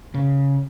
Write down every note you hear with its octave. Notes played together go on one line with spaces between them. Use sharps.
C#3